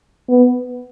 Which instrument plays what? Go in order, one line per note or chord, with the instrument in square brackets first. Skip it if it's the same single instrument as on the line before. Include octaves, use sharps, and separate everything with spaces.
[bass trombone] B3